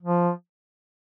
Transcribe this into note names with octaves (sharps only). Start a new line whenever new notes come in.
F3